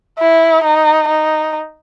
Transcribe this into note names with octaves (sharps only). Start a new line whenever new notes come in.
E4
D#4
D#4